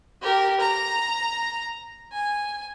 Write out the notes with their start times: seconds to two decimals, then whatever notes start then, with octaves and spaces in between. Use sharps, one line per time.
0.22 G4 A#4
0.60 A#5
2.12 G#5